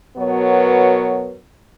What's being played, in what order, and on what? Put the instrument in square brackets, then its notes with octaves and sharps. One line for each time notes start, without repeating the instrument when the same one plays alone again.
[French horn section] B2 F#3 B3 A#4 B4 C#5